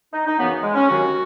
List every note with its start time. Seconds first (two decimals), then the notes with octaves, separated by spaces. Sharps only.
0.13 D#4
0.25 D#4
0.37 F#2 C#3 E3 B3
0.62 G#3
0.75 C#4
0.87 D#2 D#3 F#3 F#4